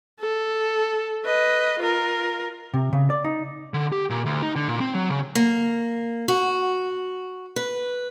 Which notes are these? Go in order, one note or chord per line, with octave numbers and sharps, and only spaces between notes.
A4
B4 D#5
F4 A#4
C3
C#3
D5
D#4
D3
G4
A#2
D2
D#4
D3
A#2
C4
F#3
C#3
A#3
F#4
B4